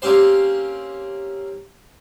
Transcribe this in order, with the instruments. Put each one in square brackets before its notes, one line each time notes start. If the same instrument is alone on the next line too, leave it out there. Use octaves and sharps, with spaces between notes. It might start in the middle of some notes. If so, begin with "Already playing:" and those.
[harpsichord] A#3 C4 C#4 G4 C5